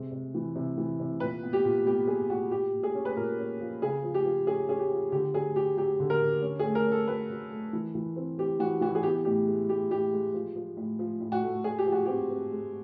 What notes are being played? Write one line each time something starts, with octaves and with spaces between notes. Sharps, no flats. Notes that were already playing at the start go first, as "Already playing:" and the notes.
Already playing: C3 G#3
C3
E3
C3
E3
C3
A#2 B4
B3
G4
A#2
B3 G4
F#3 G#4
A#2 F#4
A#2 G4
A#2
G#4
C#4
B4
A#2 A#4
C#4
F3
C#3 G#4
F3
G4
F3
C#4 G#4
C#4 G#4
G4
F3
D3 G4
F#3 G#4
F#3 G4
F#3 G4
D3
A#4
D3
C#4
G#4
A3
A#4
C#4
A4
F#3 B4
F#3
A3
E3
E3
C4
C4 G4
E3 F#4
E3 F#4
G#4
B3 G4
A2 G4
G#3
G#3 G4
A2 G4
G#3
F3
F3
A2
F3
A2
F#4
A3
G#3 G#4
G4
F3
F#4
C4 G4
C4
G#3